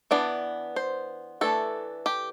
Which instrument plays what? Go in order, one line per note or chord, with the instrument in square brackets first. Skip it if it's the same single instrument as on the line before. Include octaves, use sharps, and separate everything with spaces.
[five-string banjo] E3 B3 D4 D5
C5
E3 A3 D4 A4
G4